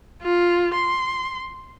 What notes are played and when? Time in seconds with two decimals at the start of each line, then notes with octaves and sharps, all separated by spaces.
0.22 F4
0.74 C6